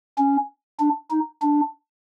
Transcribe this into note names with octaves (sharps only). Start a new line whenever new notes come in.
C#4
D4
D#4
D4